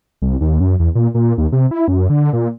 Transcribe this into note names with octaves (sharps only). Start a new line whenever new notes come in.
C2
D#2
F#2
E2
A#2
A#2
D#2
C3
E4
F#2
D3
A#2